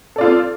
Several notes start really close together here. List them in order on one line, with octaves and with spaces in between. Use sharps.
A4 D5 F4 C4